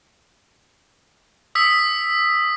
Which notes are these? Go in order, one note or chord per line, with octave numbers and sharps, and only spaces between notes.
D#6 E6 B6